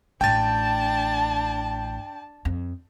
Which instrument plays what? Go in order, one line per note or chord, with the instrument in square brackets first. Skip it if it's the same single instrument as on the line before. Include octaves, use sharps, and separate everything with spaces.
[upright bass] A1 A2 [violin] D4 A5 [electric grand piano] G5 A6
[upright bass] F2